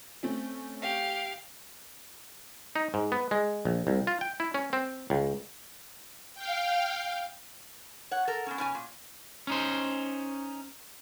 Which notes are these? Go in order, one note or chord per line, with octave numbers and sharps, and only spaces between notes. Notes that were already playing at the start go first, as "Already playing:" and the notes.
A3 C4 C#4
G4 F5
D#4
G#2
B3
G#3
A#1
C2
F4
G5
E4
C#4
C4
C#2
F5 G5
C#5 F#5
A4 A#4
B3 C#4
B2 C#4 G#5
A#2
C#4 D#4 C5